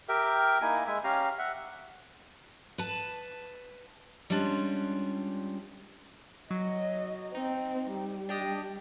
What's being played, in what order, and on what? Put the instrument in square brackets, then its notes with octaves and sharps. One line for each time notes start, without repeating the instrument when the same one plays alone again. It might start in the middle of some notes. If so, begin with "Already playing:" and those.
[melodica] G4 A#4 E5 G5
A#3 D#4 E4 G#5
G#3 E5 G#5
C#4 G4 F5 A#5
E5 F#5
[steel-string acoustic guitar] B4 A5
G3 G#3 C#4 D4 F4
[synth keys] F#3 [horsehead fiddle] D#5
[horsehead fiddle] C4 [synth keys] D#4
[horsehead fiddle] G3
[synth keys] D4 G4 D#5